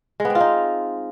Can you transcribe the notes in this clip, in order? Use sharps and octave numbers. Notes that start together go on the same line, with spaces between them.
G#3
B3
C4
F4
D#4